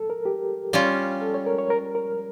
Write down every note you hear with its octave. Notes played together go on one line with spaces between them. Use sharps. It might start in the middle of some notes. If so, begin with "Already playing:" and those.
Already playing: A4
A#4
G4
G3 C#4 F4
A4
C#5
A#4
C#5
A#4
A#4